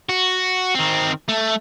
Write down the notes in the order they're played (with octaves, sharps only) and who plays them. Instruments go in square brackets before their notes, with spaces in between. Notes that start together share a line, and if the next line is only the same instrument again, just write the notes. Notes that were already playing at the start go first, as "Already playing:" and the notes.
[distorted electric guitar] F#4
D#3 C4
A3